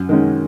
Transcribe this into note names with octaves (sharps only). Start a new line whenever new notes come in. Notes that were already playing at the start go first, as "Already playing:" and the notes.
Already playing: F#2
D#3 G#3 C#4